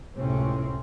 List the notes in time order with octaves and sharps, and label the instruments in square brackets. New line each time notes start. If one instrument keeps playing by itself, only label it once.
[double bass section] C#2 A2 C3 C4 C#4